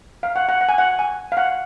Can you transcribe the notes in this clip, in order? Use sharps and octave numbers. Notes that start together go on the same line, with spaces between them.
F5
F#5
F#5
F#5
G#5
F#5
G#5
F5
F#5